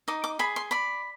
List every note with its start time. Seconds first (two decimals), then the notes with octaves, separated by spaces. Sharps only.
0.08 D#4 D6
0.24 D6
0.39 G#4 B5
0.56 C6
0.71 D5 B5